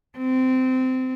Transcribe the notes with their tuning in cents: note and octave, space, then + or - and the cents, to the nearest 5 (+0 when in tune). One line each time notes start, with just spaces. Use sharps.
C4 -20